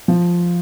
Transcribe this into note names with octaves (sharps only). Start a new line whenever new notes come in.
F3